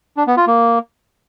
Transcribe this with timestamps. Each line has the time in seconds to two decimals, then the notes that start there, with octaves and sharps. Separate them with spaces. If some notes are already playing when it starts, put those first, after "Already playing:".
0.17 D4
0.27 B3
0.37 F4
0.47 A#3